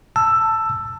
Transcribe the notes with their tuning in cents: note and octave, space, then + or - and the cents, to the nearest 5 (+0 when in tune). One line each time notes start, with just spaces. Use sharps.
A5 +10 E6 +10